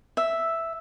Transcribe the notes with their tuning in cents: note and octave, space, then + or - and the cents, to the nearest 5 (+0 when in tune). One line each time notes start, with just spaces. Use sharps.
E5 +0